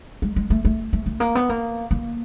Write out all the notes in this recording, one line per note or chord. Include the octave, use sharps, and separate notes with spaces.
G#3
G#3
A3
A3
A3
A3
A#3
B3
A#3
A#3